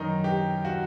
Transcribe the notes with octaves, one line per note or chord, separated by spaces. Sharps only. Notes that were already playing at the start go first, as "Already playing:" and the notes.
Already playing: F#2 D#3 D#4
G4
F#4